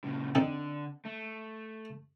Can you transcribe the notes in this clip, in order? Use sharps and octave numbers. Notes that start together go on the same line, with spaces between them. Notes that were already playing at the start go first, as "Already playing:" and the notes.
A#2 C#3
D3 C4 D#4 A4
A3